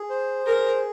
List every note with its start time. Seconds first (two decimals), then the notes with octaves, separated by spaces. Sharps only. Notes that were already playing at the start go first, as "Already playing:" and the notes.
Already playing: G#4
0.10 C5
0.46 G#4 A#4